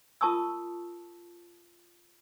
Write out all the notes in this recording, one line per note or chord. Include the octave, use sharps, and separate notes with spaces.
F4 A#4 A5 C#6 D#6 E6